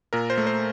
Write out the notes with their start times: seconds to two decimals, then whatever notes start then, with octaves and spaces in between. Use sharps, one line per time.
0.13 A#2 A#4
0.30 C5
0.38 A3
0.47 C5